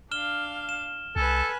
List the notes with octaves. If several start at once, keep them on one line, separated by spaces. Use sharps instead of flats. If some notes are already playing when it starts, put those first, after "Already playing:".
D4 F5 F6 E7 G7
E7
C2 A4 B4 G#5